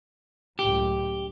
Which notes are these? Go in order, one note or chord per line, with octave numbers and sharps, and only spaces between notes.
C#2 F#2 A2 G4